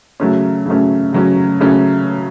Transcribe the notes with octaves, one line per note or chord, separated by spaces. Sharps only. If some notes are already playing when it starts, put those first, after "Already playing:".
C#3 F#3 A3 C#4
C#3 F#3 A3 C#4
C#3 F#3 A3 C#4
C#3 F#3 A3 C#4